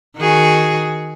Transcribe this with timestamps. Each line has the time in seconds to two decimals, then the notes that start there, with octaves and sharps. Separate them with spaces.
0.17 D#3 F#4 G#4